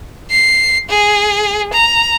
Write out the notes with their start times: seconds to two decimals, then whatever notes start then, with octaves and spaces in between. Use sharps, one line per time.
0.31 C7
0.90 G#4
1.73 A#5